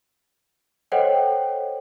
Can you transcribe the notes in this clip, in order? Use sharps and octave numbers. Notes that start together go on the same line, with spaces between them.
A4 C5 C#5 D#5 F#5 G5